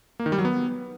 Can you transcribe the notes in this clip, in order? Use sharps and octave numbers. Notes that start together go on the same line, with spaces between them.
A#3
D#3
G3
F#3
B3